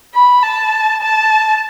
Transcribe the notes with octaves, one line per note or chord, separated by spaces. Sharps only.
B5
A5
A5